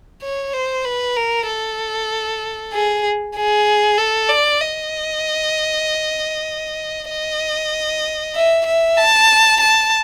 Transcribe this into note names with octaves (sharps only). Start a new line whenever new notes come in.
C#5
C5
B4
A#4
A4
G#4
G#4
A4
D5
D#5
D#5
E5
E5
A5
A5